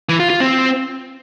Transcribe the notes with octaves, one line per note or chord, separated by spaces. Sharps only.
E3
F4
F4
C4